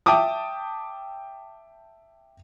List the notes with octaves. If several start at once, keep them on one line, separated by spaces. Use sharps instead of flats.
E5 G5 A5 D6 D#6